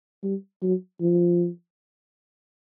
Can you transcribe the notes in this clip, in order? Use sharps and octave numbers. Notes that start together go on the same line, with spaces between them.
G3
F#3
F3